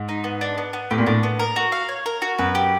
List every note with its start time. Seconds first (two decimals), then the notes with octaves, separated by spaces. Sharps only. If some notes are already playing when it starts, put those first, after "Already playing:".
Already playing: G#2
0.09 D#4
0.24 B3
0.41 D4
0.58 B3
0.73 B3
0.91 A2 G4
0.98 A#2
1.06 A2 D4
1.23 B3
1.39 A#4
1.56 F#4
1.72 F5
1.89 C#5
2.06 A#4
2.22 F#4
2.38 F#2 B4
2.55 G4